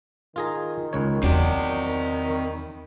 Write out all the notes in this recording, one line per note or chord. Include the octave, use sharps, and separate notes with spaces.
D#3 F4 G#4 A#5
C#2 C#5
E2 F#3 C4 G4 D5